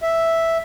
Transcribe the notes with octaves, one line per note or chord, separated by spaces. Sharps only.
E5